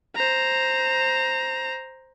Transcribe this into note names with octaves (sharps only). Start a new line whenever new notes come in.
C5 A#5